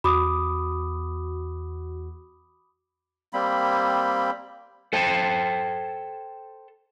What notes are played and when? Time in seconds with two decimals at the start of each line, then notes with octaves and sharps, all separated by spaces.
0.04 E2 F#4 B5 D6 D#6
3.33 G3 A#3 C4 B5
4.93 A4 C5 G5 A5